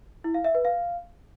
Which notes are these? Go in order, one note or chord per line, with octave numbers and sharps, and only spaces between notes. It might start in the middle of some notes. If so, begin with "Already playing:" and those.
E4
F5
E5
B4
F5